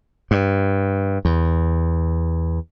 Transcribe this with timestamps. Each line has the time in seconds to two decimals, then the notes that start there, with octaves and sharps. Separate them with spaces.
0.31 G2
1.25 E2